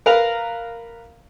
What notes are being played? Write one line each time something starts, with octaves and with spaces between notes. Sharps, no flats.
A#4 B4 F5 A#5